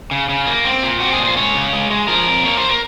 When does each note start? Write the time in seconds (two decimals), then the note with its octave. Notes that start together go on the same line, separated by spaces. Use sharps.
0.11 C#3
0.29 C#3
0.47 A#3
0.65 C4
0.83 A#2
1.00 C4 F#4
1.13 G#4
1.19 A#2
1.25 C5
1.37 G#3 C#5
1.55 C#3
1.73 G#3
1.90 G#3
2.08 F3 A#4
2.26 F2
2.44 A#3 C#5
2.57 C5
2.69 A#4